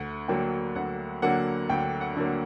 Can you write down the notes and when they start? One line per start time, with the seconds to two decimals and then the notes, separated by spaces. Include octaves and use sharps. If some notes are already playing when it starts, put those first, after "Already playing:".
Already playing: D2 F#5
0.28 D3 F#3 A#3 G5
0.75 D2 F#5
1.22 D3 F#3 A#3 F#5
1.69 D2 G5
2.01 F#5
2.17 D3 F#3 A#3